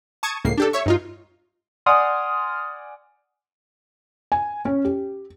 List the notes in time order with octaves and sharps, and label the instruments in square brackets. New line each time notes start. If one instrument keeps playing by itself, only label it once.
[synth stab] A5 C#6 D#6 G#6
C#2 A2 A#3 C7
D4 G4 A4
C#5 E5 C#6
G2 D#4 F4
[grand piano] D5 F#5 G#5 [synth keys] C6 D#6 F6
[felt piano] G#5
C#4
G4